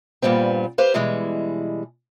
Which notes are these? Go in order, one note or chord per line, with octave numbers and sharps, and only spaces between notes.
G2 A#2 G3 B3 C4
G4 B4 C5 F5
B2 E3 G3 G#3